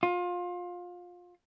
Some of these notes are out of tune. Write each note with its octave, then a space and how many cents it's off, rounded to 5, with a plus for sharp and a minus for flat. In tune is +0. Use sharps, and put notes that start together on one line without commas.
F4 +25